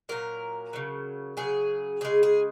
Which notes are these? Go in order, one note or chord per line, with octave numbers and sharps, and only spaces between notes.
A#2 F#3 A#4
C#3 F#3
C#3 F#3 G#4
C#3 G#3 G#4
G#4